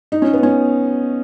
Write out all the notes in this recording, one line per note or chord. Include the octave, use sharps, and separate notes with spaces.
D#4
C#4
B3
C#4